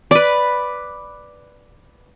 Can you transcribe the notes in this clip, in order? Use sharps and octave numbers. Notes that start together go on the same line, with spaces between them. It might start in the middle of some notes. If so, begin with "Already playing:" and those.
B4 D5